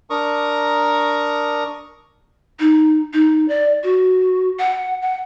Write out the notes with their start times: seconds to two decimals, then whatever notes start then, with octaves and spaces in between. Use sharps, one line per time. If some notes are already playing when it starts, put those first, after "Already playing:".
0.10 D4 A#4 A#5 C#6 D#6
2.60 D#4
3.13 D#4
3.48 D5
3.83 F#4
4.59 F#5
5.02 F#5